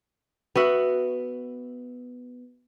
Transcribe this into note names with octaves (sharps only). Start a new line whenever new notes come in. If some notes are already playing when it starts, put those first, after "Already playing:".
B3 F#4 E5 F#5